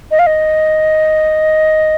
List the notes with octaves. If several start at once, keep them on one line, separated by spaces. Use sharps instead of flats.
D#5
F5
D#5